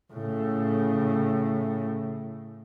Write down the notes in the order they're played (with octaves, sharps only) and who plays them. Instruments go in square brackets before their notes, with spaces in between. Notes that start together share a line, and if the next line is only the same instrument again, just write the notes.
[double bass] A2 C#3